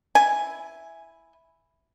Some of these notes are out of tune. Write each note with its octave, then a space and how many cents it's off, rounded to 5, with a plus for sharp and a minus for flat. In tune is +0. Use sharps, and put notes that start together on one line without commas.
E4 +0 G#5 +0